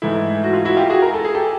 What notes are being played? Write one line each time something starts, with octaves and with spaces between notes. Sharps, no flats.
G#2 E3 A3 E4
F#4
F4
E4 F#4
F4 G4
F#4 G#4
A#4
A4
G#4
G4 A4